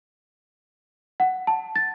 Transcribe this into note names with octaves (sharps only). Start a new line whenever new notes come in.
F#5
A5
A6